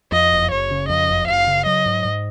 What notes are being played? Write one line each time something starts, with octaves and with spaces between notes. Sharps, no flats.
F2 D#5
F#1
F#1 C#5
C#3
F2 D#5
F#1
F#1 F5
C#3
F#3 D#5
G#2
G#2